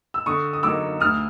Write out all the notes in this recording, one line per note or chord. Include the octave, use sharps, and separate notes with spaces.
E6
D3 C#6 D#6
D#6
F#3 A#3 D#4 D6 E6
D2 D#6 F6